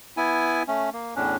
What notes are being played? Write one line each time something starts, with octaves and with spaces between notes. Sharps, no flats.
B3 E4 G#5
A3 C#4
A#3
E2 A2 C#4 D4